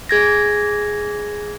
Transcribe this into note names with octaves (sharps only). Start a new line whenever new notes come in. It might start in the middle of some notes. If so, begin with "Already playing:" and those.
G#4 G#6 A#6